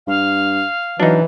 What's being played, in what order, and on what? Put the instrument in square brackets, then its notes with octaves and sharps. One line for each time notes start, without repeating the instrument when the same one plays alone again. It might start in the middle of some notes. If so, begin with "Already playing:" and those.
[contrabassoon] G2 [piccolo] F5
[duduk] E3 [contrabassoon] F#3 [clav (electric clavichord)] D4 D#4